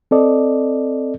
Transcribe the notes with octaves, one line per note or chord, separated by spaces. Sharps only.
C4 A4 D5 D#5